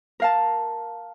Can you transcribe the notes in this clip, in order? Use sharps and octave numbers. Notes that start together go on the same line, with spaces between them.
A#4 F5 A5